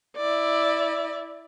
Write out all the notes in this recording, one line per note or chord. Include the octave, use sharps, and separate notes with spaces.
E4 D5